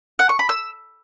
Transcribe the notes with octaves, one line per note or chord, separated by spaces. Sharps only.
F#5
C#6
B5
E6